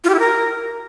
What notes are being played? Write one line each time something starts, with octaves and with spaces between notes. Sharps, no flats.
F4
G4
E4
A#4